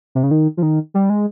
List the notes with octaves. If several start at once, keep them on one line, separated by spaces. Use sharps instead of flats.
C3
C#3
D#3
F3
D#3
G3
G#3